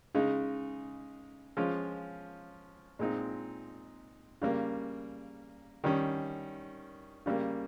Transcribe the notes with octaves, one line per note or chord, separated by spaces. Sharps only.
C#3 G#3 D#4
F3 G#3 C#4 F4
A#2 G#3 C4 D#4
C#3 G3 A#3
D#3 G3 C#4
C#3 G3 A#3